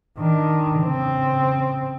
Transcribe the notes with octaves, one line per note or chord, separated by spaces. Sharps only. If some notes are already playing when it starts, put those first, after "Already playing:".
D#3 D4
C#3 C4